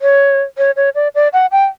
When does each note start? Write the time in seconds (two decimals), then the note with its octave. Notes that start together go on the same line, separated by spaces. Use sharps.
0.02 C#5
0.58 C#5
0.76 C#5
0.95 D5
1.15 D5
1.33 F#5
1.52 G5